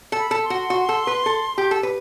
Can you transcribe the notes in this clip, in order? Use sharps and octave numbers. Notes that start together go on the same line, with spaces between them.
A4
B5
A4
C6
F#4
F#4
A4
B4
A4
G4
A4
B4